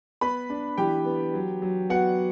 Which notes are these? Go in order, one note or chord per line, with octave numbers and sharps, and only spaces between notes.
B3 B4 B5
D4
E3 G4 G5
B3
F#3
F#3
B3 F#4 F#5